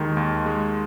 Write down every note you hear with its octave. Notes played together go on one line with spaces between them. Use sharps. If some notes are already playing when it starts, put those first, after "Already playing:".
Already playing: D#2 D#3 G#3
D#2
G#3